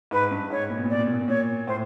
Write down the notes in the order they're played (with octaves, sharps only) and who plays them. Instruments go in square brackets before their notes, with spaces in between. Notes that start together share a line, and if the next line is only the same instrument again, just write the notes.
[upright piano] G#2 [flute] B4
[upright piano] G2
[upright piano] G#2 [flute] C#5
[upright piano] A#2
B2
A#2
[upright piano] B2 [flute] D5
[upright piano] A#2
B2
A#2
B2
[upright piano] A#2 [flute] C#5
[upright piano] A2 [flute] C5